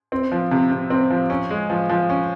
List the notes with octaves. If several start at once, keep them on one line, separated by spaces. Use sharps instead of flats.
C4
F3
C3
C3
C4
F3
C#4
G#3
F3
F3
C#4